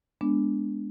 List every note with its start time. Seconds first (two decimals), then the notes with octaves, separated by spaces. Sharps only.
0.21 G#3 B3 D4